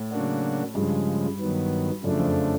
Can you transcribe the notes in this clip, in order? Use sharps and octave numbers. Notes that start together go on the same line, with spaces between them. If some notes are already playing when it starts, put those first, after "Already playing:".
Already playing: A2
C#3 F#3 A#3 D4 F#4
G2 C#3 F3 G#3
G2 D#3 F#3 B3
F#2 C#3 F3 A3 D4
F2